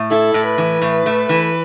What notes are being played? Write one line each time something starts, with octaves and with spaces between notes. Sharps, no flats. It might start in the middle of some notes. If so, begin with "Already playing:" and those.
Already playing: A2
E4 A4
A2
B4
E3
A2
A3
E3